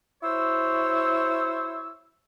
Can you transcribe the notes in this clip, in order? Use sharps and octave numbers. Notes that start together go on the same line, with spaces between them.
E4 F#4 C5 C#5 E6